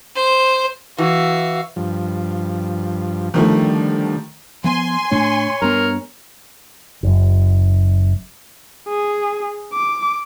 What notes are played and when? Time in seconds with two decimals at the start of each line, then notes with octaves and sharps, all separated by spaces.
0.15 C5
0.98 E3 F#4 F5
1.76 G2 F3
3.34 D3 D#3 F3 G3 A3
4.64 F3 B3 G#5 C6
5.11 A2 A3 D4 C#5
5.62 G2 B3 A#4
7.03 F#1 F#2
8.88 G#4
9.74 D6